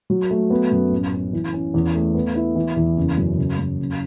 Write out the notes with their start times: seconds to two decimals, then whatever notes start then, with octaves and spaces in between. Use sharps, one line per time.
0.10 F#3
0.31 A3
0.50 B3
0.71 F#2
0.91 A1
1.13 C#4
1.33 E3
1.53 C#4
1.74 E2
1.95 A3
2.15 B3
2.35 E4
2.55 E3
2.76 E2
2.97 F#1
3.17 F#2
3.38 C#3
3.59 F#2
3.79 F#1